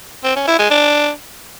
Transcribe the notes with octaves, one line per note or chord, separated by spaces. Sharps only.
C4
C#4
E4
G#3
D4